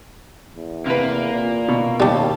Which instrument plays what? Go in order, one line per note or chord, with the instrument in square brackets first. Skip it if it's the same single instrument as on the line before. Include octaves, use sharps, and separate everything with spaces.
[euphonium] E2
[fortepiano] C3 B4 [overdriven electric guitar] A#3
[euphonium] A#2
[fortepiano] B2
[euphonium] D#2 [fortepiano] B2 A5 [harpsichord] G3 G4